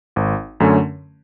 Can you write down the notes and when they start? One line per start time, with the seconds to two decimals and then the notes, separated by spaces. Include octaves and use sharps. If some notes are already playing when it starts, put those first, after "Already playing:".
0.16 G#1
0.60 F#2 D3 A3 C#4